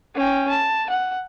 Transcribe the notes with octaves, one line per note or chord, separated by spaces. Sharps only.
C#4 G5
A5
F#5